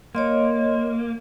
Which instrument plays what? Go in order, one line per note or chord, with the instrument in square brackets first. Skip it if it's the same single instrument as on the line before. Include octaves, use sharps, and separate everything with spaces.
[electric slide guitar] A#3 [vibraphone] C#5 D#5 C6